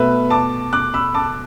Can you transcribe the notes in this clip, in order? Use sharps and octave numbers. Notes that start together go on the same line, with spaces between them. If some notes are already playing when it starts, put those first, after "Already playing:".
Already playing: B2 A3 B4 E5
A5 D6
D6 F#6
B5 E6
A5 D6